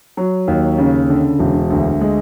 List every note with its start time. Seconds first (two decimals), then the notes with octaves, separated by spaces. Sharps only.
0.17 F#3
0.47 D#2
0.78 C#3
1.09 D3
1.39 E1
1.70 D2
2.01 G#3